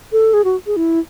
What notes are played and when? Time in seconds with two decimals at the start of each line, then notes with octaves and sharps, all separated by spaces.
0.12 A4
0.34 G#4
0.44 F#4
0.66 G#4
0.76 E4